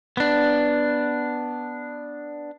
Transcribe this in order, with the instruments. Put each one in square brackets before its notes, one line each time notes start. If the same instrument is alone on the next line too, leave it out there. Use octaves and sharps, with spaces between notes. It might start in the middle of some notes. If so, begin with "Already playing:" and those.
[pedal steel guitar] B3 D4